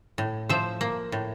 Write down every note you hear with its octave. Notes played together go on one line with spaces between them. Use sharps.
A2
F3 C5 E5
A#3
A2